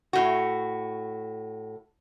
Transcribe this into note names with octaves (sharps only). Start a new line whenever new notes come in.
A2 F#4